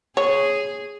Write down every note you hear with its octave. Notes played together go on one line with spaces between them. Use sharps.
G#4 C#5